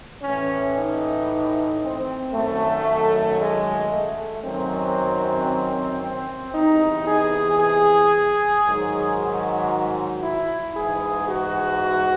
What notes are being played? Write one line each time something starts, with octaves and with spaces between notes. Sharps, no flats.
A2 E3 C#4
D#4
C4
F#2 D#3 F#3 A3
G#3
A3
F#2 D#3 F#3 C4
C4
E2 C3 E3 D#4
G#4
G#4
G#2 D#3 F#3
F#4
E4
G#2 E3 G#4
F#4